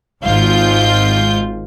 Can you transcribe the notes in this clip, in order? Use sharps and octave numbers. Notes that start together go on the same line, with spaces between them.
G#1 G#2 F4 G6